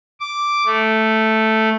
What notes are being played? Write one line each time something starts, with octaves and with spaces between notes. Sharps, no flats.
D6
A3